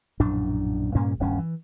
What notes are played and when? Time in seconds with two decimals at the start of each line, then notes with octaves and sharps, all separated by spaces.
0.20 A#1 F#2 A2 D4
0.95 G2 A#2 A#3 C#4
1.20 D#1 D2 G2 C#4
1.38 E3